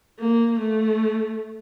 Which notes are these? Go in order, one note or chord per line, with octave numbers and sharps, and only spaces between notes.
A#3
A3